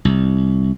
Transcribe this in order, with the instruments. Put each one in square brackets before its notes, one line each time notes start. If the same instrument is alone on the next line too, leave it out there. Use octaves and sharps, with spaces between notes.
[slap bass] C2